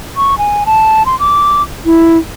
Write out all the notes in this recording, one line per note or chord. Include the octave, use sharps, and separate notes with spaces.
C#6
G#5
A5
C6
D6
E4